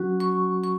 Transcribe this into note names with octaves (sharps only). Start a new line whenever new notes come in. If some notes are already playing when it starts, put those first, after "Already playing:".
Already playing: F#3 C#4 F#4
C#6
C#6